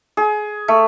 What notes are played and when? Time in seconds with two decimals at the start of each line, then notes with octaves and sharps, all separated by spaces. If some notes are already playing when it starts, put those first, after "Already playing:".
0.17 G#4
0.68 A3